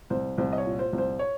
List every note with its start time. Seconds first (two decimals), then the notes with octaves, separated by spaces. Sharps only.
0.10 C2 C5
0.38 C2 C5
0.53 D#5
0.58 C#5
0.65 A#2
0.79 C5
0.93 C2
0.98 C5
1.19 C#5